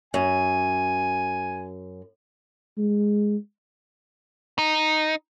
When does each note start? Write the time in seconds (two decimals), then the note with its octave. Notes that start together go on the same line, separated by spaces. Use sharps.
0.14 F#2 G#5
2.78 G#3
4.59 D#4